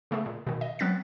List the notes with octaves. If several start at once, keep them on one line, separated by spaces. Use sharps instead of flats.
C#3 A3 B3 G#4
A#2
B2 D#3
D#5
F#3 B3 C4 F#6 A6 B6